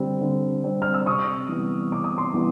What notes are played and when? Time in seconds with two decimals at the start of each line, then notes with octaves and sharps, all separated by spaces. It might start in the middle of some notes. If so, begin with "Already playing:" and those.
Already playing: D3 G3 C4
0.21 D3
0.63 G3 C4
0.82 F6
0.94 E6
1.06 C3 C#6 D#6
1.48 E3 G3 B3
1.92 C3 D6
2.04 D#6
2.18 C6 D6
2.34 E3 G3 B3